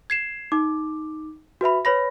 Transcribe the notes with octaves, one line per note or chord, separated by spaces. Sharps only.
G#6 C7 E7
D#4 D6
F#4 B4 E5 B5
B4 C#5 B5 A#6